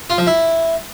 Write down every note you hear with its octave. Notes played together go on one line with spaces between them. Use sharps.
F4
F3
E4